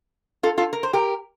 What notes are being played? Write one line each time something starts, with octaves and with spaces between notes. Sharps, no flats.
F4 A4
F4 A4
A#4
C5
G4 A#4